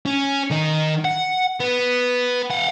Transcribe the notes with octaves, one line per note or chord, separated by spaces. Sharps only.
C#4
D#3 D#5
F#5
B3
F5 F#5